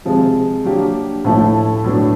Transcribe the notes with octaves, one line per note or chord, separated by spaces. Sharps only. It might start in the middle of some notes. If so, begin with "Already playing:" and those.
C3 F3 G#3
F#3 A#3 D4 G4
A2 F3 A3 C#4 E4
A2 F#3 B3 D4